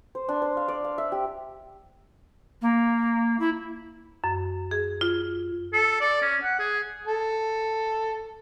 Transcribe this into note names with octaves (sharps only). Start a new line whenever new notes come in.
C5
D4
C5
F5
D5
F5
E5
G4
A#3
E4
F#2
G#4
F4
A4
D5
C#4
F#5
G#4
A4